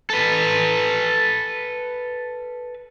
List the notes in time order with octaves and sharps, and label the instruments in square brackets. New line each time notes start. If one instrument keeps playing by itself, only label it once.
[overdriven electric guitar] A4 B4